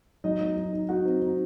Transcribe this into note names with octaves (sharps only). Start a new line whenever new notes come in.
F#3 D#4 D#5
F#3
D#4
D#4
D#4 F#4 F#5
C4
D#4